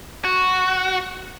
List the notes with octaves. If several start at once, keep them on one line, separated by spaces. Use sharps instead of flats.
F#4